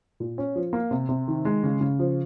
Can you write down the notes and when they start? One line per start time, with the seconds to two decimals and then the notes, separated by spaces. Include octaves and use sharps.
0.20 A#2
0.38 C#4
0.55 F3
0.73 A#3
0.91 C3
1.09 C3
1.28 D#3
1.45 G#3
1.63 C#3
1.81 C#3
1.99 F3